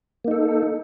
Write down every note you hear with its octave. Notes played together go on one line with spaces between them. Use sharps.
A#3 D#4 A4